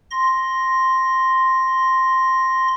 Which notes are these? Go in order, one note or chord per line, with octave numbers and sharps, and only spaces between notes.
C6 A#6